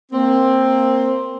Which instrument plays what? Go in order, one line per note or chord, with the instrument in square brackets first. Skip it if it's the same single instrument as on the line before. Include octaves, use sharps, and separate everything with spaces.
[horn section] A#3 C4